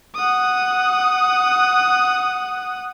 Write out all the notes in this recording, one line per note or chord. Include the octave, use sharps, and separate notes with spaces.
F#5 D#6